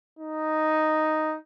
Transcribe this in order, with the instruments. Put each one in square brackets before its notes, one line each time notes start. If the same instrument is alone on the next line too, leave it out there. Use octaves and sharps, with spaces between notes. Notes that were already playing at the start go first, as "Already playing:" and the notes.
[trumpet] D#4